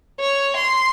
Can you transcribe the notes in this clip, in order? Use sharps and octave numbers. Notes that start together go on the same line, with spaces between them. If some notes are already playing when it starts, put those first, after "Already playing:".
C#5
C6